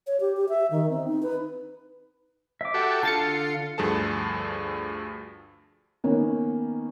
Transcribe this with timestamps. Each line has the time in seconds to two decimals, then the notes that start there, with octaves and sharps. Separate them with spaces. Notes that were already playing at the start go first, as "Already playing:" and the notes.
0.07 C#5
0.21 G4
0.37 G4
0.49 E5
0.71 D#3
0.90 C4
1.08 D#4
1.23 B4
2.61 E5 D6
2.74 F#4 G4 A4
3.03 D3 F4 A5 A6 C#7
3.78 D2 G2 F3 G#4 A4 A5
6.04 D#3 A#3 B3 C#4